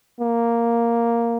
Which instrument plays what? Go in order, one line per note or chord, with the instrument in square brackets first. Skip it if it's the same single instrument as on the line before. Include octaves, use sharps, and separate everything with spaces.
[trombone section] A#3